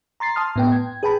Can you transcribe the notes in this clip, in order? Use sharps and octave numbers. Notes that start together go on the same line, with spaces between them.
A#5 C6 A6 C7
A5 C6 D#6 F6
A2 B3 G5
G#6
G#4 B4 G5 A5 B5